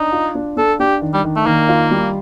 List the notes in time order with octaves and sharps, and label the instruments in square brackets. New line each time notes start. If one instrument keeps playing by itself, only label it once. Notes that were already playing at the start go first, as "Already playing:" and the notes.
Already playing: [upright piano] D4 [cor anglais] D#4
[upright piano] F4
D4
[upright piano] D4 [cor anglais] A4
[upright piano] D4 [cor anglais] G4
[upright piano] D#3
[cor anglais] G3
[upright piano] D#3
[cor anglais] A3
[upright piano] D#3 [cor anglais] A#3
[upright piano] F4
G3